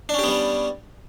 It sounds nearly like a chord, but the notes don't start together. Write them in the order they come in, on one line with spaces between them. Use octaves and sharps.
D4 C#4 G4 B3 G3